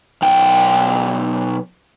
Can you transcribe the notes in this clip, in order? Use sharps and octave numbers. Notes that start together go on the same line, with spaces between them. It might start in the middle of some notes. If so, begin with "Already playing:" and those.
B1 G5